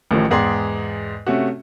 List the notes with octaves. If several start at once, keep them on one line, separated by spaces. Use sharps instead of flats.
A1 A2 D#3 F3
E2 G#2 G#4 D5 G5 C6
C3 A3 C#4 F#4